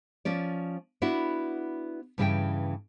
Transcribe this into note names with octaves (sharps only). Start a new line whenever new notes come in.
F3 C#4 D5
B3 D4 E4 F#4
G2 C#3 E3 G#4 E5 G5